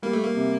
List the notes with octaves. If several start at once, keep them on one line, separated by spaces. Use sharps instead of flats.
G3 A#3
A3
A#3
C3